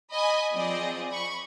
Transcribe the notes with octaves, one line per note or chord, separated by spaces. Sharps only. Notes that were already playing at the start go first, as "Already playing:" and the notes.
D#5 G#5 B5
F3 C4 G#4 D5 D#5
B5 C#6